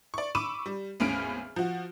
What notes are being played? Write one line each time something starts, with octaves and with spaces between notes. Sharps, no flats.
D5 C#6
B5 C#6 D6 E6 D#7 E7
G3
G#1 E2 A2 C#4 F6 D7
F3 F#4